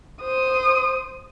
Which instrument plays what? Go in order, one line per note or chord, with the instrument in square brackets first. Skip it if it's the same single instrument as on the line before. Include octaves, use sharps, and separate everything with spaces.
[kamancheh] C5 D#6